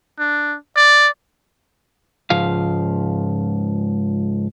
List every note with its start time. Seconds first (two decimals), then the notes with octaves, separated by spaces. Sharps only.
0.19 D4
0.77 D5
2.30 C#2 G#2 F3 F5